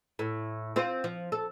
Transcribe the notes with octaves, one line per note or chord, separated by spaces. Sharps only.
A2
C4 F4 C5
F3
A4